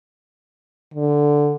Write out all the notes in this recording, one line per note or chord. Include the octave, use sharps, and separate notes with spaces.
D3